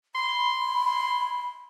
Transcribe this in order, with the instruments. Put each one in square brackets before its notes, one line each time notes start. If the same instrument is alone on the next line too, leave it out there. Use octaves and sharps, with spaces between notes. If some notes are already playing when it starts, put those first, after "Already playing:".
[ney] B5 [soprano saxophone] C6